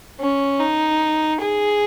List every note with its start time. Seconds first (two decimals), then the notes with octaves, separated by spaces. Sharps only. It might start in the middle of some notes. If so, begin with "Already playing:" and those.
0.20 C#4
0.60 D#4
1.41 G#4